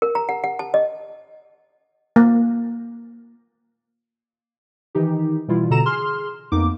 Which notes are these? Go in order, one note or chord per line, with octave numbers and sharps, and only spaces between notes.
A#4
A#5
F#5
F#5
A5
D#5
A#3
D#3 E3 D#4 G4
B2 E3 G3 E4 F4
B2 D3 A4 A#5 E7
G#4 C6 F6
F2 A#3 B3 D#4 D6